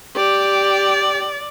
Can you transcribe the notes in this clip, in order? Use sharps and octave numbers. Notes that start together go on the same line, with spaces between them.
G4 D5